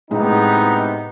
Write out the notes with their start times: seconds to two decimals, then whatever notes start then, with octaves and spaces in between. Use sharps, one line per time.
0.11 A2 C3 G#3 B3 D#4